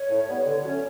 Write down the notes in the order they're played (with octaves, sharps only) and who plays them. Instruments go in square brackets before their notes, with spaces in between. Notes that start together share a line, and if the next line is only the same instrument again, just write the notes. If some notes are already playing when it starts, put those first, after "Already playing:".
Already playing: [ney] C#5
[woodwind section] A2
G3 B3
[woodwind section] D3 [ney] C#5
[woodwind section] F#3 A3 C#4